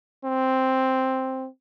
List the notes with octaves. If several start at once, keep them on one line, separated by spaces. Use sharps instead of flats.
C4